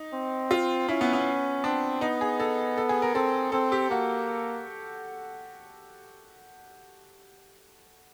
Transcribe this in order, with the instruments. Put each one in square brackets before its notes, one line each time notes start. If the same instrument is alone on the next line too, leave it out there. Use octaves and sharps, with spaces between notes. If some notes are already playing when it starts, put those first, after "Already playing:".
Already playing: [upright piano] D#4
[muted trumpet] C4
[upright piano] F4
[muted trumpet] C#4 [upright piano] E4
[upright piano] B3
B3
[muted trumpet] C4 [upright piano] D4
[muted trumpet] B3 [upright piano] D#4
[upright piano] G#4
A4
A4
G#4
A#4
[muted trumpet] C4 [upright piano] A4
[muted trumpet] C4 [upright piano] A4
[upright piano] G4
[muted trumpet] A#3 [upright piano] F#4